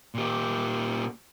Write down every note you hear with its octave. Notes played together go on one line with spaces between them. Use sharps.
A#2 G4